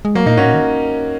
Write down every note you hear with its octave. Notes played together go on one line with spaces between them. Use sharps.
G#3
F#3 A#3
A#2 A#3 D#4
G#2 C#4 F#4
A#2
D#3